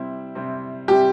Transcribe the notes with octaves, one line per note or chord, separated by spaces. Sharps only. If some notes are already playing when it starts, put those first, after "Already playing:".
Already playing: C3 G3 C4 E4
C3 G3 C4 E4
C3 G3 C4 E4 G4